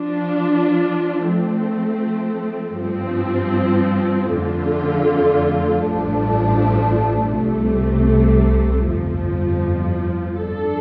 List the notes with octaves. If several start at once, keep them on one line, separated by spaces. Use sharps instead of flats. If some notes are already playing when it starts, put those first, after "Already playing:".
Already playing: F3 D4 F4
F3 A3 C4
G2 F3 C4
F2 D3 A3 F4
A1 G2 F3 A3 D4
C2 C3 A3
G1 F2 F3
F3 D4 A4